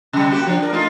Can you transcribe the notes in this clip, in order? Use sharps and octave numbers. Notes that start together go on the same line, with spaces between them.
C3 G3
A#3 F#4 G4
F3 D4
D4 A#4
A3 D#4 F4